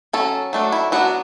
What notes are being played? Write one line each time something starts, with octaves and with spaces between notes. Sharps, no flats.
F#3 C#4 A4
F#3 A3 D4
E4
F#3 B3 D4 F#4